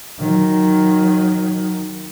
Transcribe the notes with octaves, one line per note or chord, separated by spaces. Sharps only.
D#3 F#3